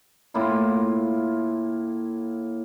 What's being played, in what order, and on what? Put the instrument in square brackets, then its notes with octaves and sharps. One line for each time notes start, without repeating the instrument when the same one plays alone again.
[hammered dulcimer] A2 A#3 E4 F4